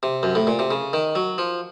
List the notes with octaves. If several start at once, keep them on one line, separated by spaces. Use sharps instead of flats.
C3
F#2
A2
A#2
C3
C#3
D#3
F#3
F3